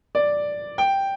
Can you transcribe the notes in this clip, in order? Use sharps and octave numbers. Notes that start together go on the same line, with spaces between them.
D5
G5